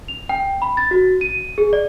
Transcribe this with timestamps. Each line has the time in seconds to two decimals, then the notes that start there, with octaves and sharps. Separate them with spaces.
0.08 F7
0.29 G5
0.62 B5
0.77 A6
0.91 F#4
1.21 D#7
1.58 G#4
1.73 D5